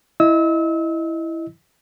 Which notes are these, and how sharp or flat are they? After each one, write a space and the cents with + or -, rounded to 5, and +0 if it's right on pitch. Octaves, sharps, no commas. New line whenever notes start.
E4 +0 D#5 +0 E6 -35